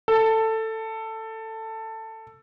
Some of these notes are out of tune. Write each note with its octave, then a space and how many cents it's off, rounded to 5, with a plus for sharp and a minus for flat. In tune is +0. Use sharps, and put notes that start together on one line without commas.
A4 +15